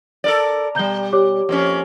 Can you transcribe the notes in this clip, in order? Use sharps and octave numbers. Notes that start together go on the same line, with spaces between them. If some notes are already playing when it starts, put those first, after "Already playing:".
A4 A#4 D5
B2 G3 A#5 G6 G7
G4 C#5 D6
F2 A#3 C#4